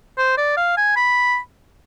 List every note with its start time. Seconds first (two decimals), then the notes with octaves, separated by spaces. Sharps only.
0.18 C5
0.38 D5
0.57 F5
0.77 G#5
0.96 B5